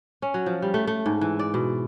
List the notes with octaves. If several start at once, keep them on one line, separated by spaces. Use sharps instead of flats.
C#4
F#3
F3
G3
A3
A3
G#2
E3
D5
B2